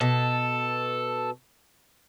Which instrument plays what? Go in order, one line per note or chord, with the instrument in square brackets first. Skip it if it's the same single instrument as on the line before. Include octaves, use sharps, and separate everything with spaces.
[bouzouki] B2 [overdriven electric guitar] A4